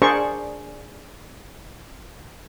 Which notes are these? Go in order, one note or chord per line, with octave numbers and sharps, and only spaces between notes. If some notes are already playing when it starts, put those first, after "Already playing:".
D4 G#4 A#4 C5 D5 C#6